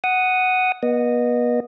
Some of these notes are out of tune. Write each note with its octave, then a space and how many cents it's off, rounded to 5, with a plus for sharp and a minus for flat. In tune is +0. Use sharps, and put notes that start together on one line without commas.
F#5 +0 D#6 +0
B3 -35 D#5 -15